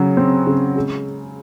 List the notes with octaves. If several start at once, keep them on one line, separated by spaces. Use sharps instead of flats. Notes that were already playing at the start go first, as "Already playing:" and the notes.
Already playing: C#3 F#3
C4
C#3
G#3